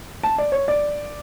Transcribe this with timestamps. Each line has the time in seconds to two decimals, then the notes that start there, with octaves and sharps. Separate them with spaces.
0.23 A5
0.38 D5
0.52 C#5
0.68 D5